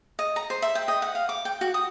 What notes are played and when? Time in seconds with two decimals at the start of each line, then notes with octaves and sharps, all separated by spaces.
0.19 D#5
0.36 A#5
0.50 C5
0.62 E5
0.75 G5
0.88 D#5
1.02 F#5
1.15 F5
1.29 D6
1.45 G5
1.61 F#4
1.74 D#6